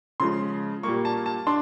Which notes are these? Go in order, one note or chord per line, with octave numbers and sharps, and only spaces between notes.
C#3 F3 G#3 C6
A#2 G3 A#3 C#6
A5
A5
D4 C6